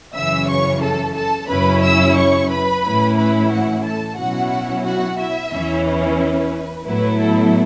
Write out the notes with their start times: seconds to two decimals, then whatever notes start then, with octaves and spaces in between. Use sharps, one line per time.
0.15 F#2 C#3 E3 C#4 E5 E6
0.49 C#5 C#6
0.82 A4 A5
1.15 A4 A5
1.49 F#2 C#3 F#3 C#4 E4 B4 B5
1.82 E5 E6
2.16 C#5 C#6
2.49 B4 B5
2.84 A2 E3 C#4 E4
3.16 B4 B5
3.50 F#4 F#5
3.83 A4 A5
4.17 B2 F#3 C#4 E4 F#4 F#5
4.84 F#4 F#5
5.18 E4 E5
5.51 E2 E3 C#4 E4
5.85 B4
6.86 A2 F#3 B3 E4 B4
7.20 A4